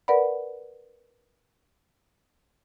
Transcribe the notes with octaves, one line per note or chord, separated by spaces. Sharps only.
A#4 B4 D5 F#5 B5